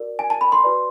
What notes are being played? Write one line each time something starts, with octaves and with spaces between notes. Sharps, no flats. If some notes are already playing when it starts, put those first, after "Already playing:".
Already playing: F#4 A#4 D5
G#5
A5
B5
C6
F#4 B4 D5